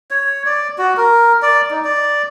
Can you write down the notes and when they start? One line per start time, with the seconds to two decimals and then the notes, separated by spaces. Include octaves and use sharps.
0.11 C#5
0.46 D5
0.78 F#4
0.97 A#4
1.42 D5
1.71 D#4
1.84 D5